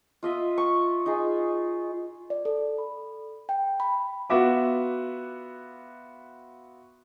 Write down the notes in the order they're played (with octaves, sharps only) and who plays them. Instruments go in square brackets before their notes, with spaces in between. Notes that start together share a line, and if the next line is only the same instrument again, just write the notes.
[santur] F4 D#5 E5
C#6
D#4 F4 G#4
[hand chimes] D5
A4
B5
G5
B5
[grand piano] B3 F4 F#4 E5 D6